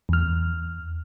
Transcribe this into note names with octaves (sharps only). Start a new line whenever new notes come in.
E2 F6